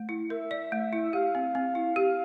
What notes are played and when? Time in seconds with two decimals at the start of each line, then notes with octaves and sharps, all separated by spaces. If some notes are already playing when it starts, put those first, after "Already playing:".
Already playing: A3
0.09 E4
0.30 A#4 E5
0.51 D5
0.72 A3
0.93 E4
1.13 G4 F5
1.35 C4
1.55 C4
1.75 E4
1.96 G4